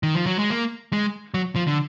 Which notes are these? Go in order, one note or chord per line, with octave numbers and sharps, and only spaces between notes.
D#3
F3
F#3
G#3
A#3
G#3
F#3
F3
D3